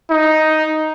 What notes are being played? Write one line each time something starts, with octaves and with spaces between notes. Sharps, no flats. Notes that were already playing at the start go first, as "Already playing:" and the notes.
D#4